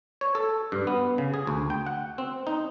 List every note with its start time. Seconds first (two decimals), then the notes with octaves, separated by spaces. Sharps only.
0.21 C#5
0.35 A4
0.72 G2
0.87 B3
1.18 C#3
1.34 G#4
1.47 D2
1.70 G5
1.86 F#5
2.18 C4
2.47 D#4